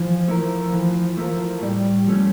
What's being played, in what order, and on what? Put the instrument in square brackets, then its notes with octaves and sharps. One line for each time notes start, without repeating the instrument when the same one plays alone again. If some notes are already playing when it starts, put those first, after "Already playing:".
Already playing: [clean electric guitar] E3 [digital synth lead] F3
[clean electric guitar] A3 E4 A#4
E3
A3 E4 A#4
[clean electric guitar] A2 [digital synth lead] G3
[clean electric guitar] F3 A3 C#4